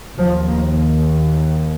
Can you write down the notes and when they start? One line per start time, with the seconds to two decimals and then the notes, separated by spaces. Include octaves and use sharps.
0.16 D#2 F3
0.48 A#3